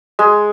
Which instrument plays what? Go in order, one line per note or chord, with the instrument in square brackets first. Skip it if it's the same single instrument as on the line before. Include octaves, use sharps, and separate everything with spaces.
[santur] G#3